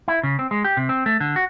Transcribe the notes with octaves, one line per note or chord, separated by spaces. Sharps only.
E4
C#3
C4
G#3
G4
C3
C4
A3
D3
F#4